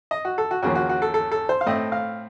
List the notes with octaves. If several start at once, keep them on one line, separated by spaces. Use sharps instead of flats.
D#5
F#4
A4
F#4
D#2 C#3 F3 A#3 F#4
F#4
F#4
A4
A4
A4
C5
F5
A2 A3 C4 D#5
F5